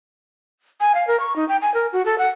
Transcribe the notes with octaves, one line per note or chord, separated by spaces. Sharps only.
G#5
F5
A#4
C#6
D#4
G5
G#5
A#4
F#4
A4
F#5